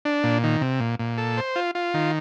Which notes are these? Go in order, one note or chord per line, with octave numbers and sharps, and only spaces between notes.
D4
A#2
D#3
C3
A#2
A#2
A4
C5
F4
F4
D#3